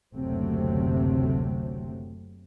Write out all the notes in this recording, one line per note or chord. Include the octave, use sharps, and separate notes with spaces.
F#1 D2 C3 F#3 A3 C4